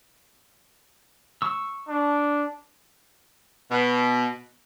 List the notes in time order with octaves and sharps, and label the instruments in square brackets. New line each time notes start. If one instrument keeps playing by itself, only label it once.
[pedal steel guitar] C#6 E6
[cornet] D4
[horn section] B2